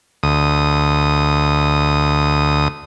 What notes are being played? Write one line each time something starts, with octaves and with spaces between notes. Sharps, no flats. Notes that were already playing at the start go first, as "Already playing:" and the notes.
D2 D#6